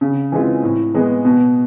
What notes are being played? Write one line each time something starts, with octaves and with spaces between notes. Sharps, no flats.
C#3
E3 G#3 C4 F4
A2
E3 G#3 B3
B2